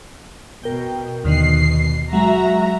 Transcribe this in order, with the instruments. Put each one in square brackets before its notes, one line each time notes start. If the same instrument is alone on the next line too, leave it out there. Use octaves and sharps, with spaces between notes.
[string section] B2 [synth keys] A#4 G5
[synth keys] D#2 D3 D#3 [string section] B2 C7
[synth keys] F#3 G#3 [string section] F#4 E5 A#5